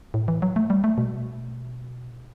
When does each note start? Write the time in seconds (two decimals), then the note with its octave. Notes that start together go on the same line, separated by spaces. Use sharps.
0.14 A2
0.28 E3
0.42 F#3
0.56 A3
0.70 G3
0.84 A3
0.98 B2